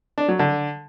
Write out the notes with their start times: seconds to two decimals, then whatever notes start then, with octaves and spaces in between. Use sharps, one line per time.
0.18 D4
0.28 F#3
0.39 D3